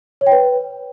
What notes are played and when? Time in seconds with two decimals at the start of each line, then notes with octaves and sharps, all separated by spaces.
0.21 C#5
0.27 G5
0.32 B4